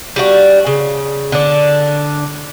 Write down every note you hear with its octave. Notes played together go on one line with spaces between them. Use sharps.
G3 D4 F#4
C#3
D3 D4